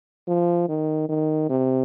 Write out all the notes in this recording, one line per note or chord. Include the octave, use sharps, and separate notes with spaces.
F3
D#3
D#3
C3